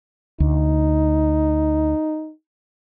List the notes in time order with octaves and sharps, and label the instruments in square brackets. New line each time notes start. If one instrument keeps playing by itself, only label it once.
[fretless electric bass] D2 [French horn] D#4